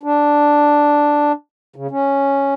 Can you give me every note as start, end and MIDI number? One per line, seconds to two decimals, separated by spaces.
0.03 1.32 62
1.76 1.87 49
1.91 2.54 61